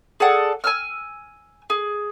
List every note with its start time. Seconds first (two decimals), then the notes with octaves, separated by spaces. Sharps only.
0.20 G#4 A4 D5 F#5
0.64 G#5 E6 F6
1.70 G#4